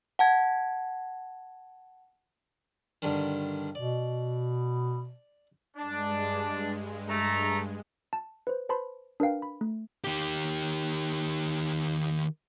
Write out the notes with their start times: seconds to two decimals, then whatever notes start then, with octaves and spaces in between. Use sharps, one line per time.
0.19 F#5 A5 G#6
3.02 G2 D3 D#3
3.75 B2 D5
5.77 G2 G#3 D4
7.09 A3 A#5
8.13 A5
8.47 B4 C5
8.69 B4 C5 A5 B5 C6
9.20 D4 A#4 B4 F5 G5
9.42 B5
9.61 A3
10.04 D#3 G4